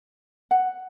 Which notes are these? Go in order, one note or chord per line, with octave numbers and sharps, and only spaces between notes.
F#5